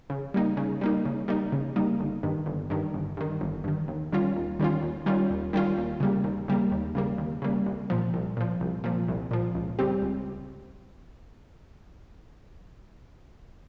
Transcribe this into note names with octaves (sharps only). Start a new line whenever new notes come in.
C#3
G3 A#3 D#4
C#3
G3 A#3 D#4
C#3
G3 A#3 D#4
C#3
G3 A#3 D#4
G1
G2 D#3
G1
G2 D#3
G1
G2 D#3
G1
G2 D#3
D#2
D#3 G3 C#4 F4
D#2
D#3 G3 C#4 F4
D#2
D#3 G3 C#4 F4
D#2
D#3 G3 C#4 F4
D#2
C#3 G3 A#3
D#2
C#3 G3 A#3
D#2
C#3 G3 A#3
D#2
C#3 G3 A#3
C2
A#2 F3
C2
A#2 F3
C2
A#2 F3
C2
A#2 F3
C#2
C#3 G3 C4 G4
C#2